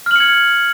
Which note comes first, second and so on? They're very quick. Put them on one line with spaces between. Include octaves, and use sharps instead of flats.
F6 F#7 C#7 G#6